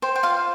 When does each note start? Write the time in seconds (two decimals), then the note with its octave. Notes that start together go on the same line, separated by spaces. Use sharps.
0.02 C5 G5
0.16 G5
0.23 F4 F5